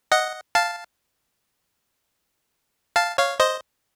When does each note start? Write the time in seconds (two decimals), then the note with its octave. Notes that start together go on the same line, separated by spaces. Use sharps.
0.12 D#5 F#5
0.55 F5 A5
2.96 F5 A5
3.18 C#5 F5
3.40 C5 D#5